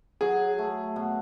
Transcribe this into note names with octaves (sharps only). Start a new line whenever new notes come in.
F#3 G#4
A3
B2